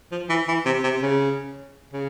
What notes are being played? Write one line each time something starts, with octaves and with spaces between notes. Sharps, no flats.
F3
E3
E3
C3
C3
C#3
C#3